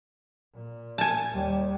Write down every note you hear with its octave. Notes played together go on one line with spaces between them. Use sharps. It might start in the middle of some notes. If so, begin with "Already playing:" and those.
A#2
G#5 A5
D#2 G3